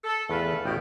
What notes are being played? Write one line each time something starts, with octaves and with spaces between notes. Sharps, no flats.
A4
E2 A3 B4 F5
A1 B2 G5